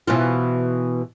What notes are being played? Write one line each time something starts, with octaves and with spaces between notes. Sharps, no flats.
B2 E3 F4